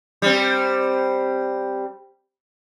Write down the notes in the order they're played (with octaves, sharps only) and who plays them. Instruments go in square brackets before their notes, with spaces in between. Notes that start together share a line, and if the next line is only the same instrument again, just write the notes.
[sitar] G3 C4